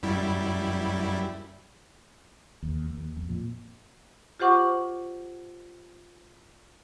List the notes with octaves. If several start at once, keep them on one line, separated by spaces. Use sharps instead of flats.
F#2 G3 E4
D#2
D#2
F2
A#2
F4 G4 C5 F#5 C#6 D6